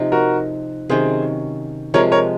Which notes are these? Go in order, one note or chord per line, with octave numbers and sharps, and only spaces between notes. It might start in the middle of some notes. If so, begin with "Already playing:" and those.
Already playing: C3 F3 C4 D#4
F#4 A#4
C3 D#3 F#3 C#4 G#4 C5
C3 F3 G#3 A#4 C#5
A#4 C#5